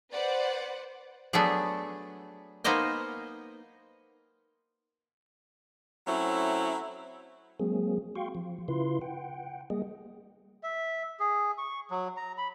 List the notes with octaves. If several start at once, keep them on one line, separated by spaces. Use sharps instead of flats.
B4 C5 D5 F#5
F#3 A3 B3 D4 G#4
A#3 B3 D#4 C5 D#5 G#5
F#3 A3 C4 C#4 E4
F#3 G#3 A#3 C4 G#4
F#4 F5 G5 C6 C#6
F3
C#3 E4 F4 B4 C6
F#5 G5
G3 A#3 G#4 D#5
E5
G#4
C#6
F#3
A#5
B5